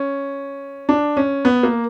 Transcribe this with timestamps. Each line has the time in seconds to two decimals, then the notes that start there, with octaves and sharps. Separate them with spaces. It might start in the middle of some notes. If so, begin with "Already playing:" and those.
Already playing: C#4
0.89 D4
1.17 C#4
1.45 B3
1.63 A#3